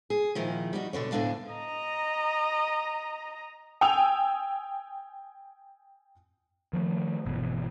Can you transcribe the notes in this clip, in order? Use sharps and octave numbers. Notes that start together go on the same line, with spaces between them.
G#4
A#2 D#3 F3 E4
G3 D#4 F#4
B2 D3 D4 C#5
D2 A2 D3 B3 D4 F5
D#5 A#5
G5 G#5 D#6 E6 F7
D#3 F3 G#3 A3
G1 B2 E3